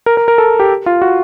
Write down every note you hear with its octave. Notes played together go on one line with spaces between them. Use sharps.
A#4
A#4
A#4
A4
G4
F4
F#4